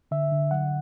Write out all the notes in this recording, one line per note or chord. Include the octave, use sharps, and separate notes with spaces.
D3 E5
D3
F#3 F#5